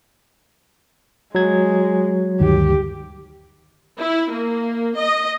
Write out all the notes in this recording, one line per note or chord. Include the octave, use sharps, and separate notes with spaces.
F#3 G#3 G#6
D2 G2 D#3 G4
E4
A#3
D#5